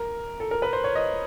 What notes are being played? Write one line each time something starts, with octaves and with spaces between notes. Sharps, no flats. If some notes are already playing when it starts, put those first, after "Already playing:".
Already playing: A#4
A4
A#4
B4
C5
C#5
D#5